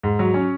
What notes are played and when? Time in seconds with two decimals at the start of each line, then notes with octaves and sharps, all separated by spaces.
0.03 G#2
0.19 F#3
0.34 C#4